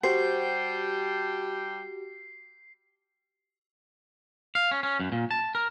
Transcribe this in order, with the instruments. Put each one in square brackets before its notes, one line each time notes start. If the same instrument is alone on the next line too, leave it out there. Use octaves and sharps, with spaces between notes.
[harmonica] G3 G5 A5 [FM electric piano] F#4 G4 [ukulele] C5 [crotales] C7
[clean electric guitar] F5
C#4
C#4
F#2
A#2
A5
A#4